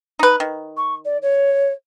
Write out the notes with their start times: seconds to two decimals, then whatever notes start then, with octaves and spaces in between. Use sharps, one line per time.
0.19 D#4 B4
0.40 D#3
0.77 C#6
1.05 D5
1.22 C#5